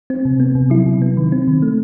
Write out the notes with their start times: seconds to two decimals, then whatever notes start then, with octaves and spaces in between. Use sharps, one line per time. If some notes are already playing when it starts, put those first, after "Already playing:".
0.10 C4
0.25 C3
0.40 B3
0.55 C3
0.70 F#3 E4
0.86 C3
1.02 B3
1.17 D#3
1.32 C4
1.48 D#3
1.62 A3